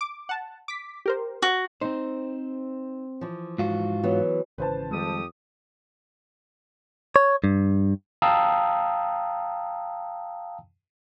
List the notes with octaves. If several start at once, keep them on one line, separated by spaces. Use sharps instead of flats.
D6
F#5 A5
D6 B6
G4 A#4 C5
F#4
C4 D#4 C5
E3 F3
G#2 F4 F#4
E3 F#3 B3
G#1 C#3 E3 B4 C5 A5
F2 D#3 G3 G#3 G4 A4 D#6
C#5
G2
F5 G5 A5 A#5 D#6 E6